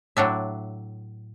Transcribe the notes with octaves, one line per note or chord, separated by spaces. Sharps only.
A2 F#3 D4 E5